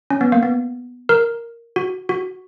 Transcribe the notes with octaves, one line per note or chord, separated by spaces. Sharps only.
C#4
B3
A#3
B3
A#4
F#4
F#4